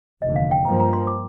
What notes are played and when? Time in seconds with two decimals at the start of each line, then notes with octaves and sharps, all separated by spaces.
0.22 F1 D#2 D3 D#5
0.36 F5
0.51 G5
0.64 G2 F3 A#3 A#5
0.80 A#5
0.93 C6
1.07 D6